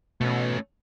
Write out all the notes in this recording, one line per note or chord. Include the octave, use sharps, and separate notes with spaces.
B2 A3 C#4